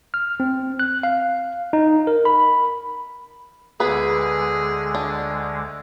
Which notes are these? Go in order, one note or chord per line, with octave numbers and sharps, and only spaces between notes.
F6
C4
F#6
F5
D#4
A#4
B5
D2 D3 G#3 B3 G#4 B4
D4